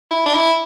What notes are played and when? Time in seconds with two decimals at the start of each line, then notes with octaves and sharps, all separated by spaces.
0.11 E4
0.26 D4
0.34 E4